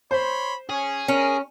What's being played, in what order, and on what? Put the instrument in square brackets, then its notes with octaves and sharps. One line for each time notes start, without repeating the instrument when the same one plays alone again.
[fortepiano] C5 [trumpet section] C#5 B5 C6
[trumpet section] C#4 [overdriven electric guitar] G#4
[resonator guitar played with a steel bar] C#4 [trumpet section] A#4